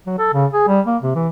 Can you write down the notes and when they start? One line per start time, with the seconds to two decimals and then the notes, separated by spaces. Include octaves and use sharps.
0.06 F#3
0.18 A4
0.33 C#3
0.53 G#4
0.68 G3
0.87 A#3
1.02 C3
1.15 E3